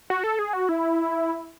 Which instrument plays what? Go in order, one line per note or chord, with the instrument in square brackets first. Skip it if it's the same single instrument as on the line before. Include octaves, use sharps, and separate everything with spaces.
[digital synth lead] F#4
A4
G#4
F#4
E4